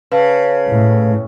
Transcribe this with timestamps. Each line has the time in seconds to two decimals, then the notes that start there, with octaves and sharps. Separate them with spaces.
0.12 C#3 B4 F5 A5
0.70 A2